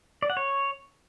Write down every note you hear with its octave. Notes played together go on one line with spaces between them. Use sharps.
D5
F#5
C#5